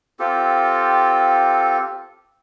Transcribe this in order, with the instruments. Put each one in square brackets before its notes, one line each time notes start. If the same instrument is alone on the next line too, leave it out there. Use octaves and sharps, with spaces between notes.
[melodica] C4 F4 G4 A4